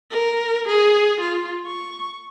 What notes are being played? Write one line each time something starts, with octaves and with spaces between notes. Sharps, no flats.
A#4
G#4
F4
C#6